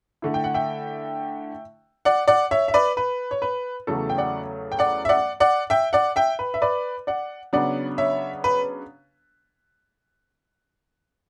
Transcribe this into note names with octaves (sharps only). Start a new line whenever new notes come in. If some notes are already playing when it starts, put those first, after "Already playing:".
D3 A3 E4
G5
F#5
E5 G5
D5 F#5
D5 F#5
C#5 E5
E5
B4 D5
B4
C#5
B4
E2 C#3 F#3 A3 A4
G5
D5 F#5
G5
D5 F#5
E5
D5 F#5
D5 F#5
E5 G5
D5 F#5
E5 G5
B4
E5
B4 D5
D5 F#5
C#3 F#3 B3 D4 D5 F#5
C#5 E5
B4